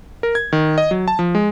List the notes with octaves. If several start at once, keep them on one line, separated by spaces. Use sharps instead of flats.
A#4
G#6
D#3
D#5
F#3
A5
F3
G#3